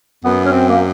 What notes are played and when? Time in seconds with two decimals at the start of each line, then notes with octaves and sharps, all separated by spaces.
0.25 F#2 B3
0.45 C#4
0.52 C4
0.69 A#3